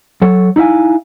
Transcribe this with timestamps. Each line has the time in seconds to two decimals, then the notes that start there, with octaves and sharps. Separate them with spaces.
0.22 F#3 A4 C#5
0.56 D#4 E4 D#5 F5 G#5